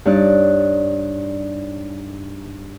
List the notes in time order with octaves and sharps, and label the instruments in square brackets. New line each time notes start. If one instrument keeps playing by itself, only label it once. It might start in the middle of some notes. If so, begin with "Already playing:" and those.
[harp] G2 D4 D#4 C#5 D5 F#6